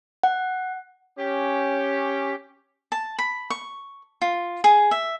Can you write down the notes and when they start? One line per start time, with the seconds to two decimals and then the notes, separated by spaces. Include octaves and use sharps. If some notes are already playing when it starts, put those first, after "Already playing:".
0.23 F#5
1.19 C#4 G4
2.92 A5
3.19 B5
3.50 C#6
4.22 F4
4.64 G#4
4.91 E5